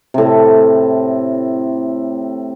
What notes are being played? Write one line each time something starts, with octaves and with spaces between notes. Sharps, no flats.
A2 C3